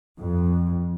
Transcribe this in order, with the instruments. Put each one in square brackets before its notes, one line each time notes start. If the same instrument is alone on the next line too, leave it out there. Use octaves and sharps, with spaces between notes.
[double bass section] F2